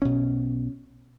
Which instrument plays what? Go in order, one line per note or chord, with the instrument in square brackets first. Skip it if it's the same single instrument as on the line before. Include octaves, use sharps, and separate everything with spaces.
[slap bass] B1 B2 C#4